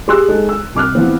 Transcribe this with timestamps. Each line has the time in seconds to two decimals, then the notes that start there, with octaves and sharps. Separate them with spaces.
0.08 G4 G#4 C6 E6 F#6
0.28 G#3 D#4 A4
0.49 E6
0.75 C2 D6 F6 F#6
0.95 E3 F3 B3 C4